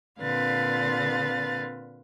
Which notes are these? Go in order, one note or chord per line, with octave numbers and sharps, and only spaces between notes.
A#2 D3 C4 B4 F5 A6